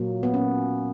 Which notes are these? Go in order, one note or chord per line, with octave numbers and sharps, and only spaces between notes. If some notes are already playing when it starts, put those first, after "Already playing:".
Already playing: A#2 F#3 A#3
B3
C#4